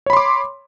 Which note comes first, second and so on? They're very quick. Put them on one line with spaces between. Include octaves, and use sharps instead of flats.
C#5 B5 C6 D6